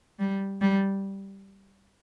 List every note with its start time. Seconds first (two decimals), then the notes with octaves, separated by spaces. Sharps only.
0.19 G3
0.61 G3